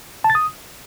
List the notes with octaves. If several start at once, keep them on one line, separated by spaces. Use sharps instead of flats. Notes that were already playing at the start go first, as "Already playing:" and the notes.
A5
A6
D#6